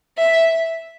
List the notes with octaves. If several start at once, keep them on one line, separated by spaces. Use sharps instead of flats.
E5